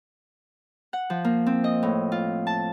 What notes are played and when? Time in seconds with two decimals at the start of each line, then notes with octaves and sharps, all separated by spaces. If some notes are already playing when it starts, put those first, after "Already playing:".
0.93 F#5
1.10 F3
1.24 A#3
1.46 C4
1.64 D#5
1.83 A2
2.12 F4
2.47 A5